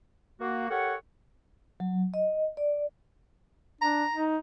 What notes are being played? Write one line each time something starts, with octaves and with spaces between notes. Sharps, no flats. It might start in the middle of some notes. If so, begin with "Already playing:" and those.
A#3 F#4
G4 A4 A#4 C#5 F#5
F#3
D#5
D5
D4 A#5
D#4